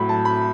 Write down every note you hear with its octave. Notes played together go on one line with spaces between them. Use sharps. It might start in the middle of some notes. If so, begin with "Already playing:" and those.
Already playing: A2 F#3 B5
A5
B5